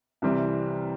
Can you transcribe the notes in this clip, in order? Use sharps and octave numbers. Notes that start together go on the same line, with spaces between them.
C2 C3 E3 G3 C4